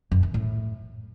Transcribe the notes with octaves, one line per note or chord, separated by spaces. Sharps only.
F#2
E3
A2